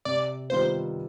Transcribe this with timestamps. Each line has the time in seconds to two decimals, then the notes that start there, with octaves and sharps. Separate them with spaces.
0.05 C3 D5
0.50 D#3 G3 B3 F4 C5